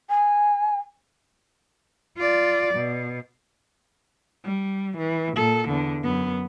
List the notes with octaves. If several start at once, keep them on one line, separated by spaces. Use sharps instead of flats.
G#5
F4 D5
B2
G3
E3
A#2 A4
E2 D3
F#2 B3